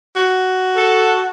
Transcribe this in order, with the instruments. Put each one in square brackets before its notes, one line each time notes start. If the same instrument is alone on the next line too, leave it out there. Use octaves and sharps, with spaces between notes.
[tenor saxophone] F#4
[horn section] A4